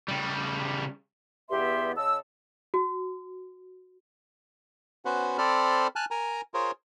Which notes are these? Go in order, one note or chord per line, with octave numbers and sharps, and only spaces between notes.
C#3 G3
E2 G2 B3 G4 E5 C6
C#3 D#5 A5 E6
F#4
B3 C#4 F#4 B4 C5 F#5
C4 A4 C5 D5 B5 F6
G#5 A5 F6 F#6
A#4 G#5 A#5
F4 G#4 A#4 C5 C#5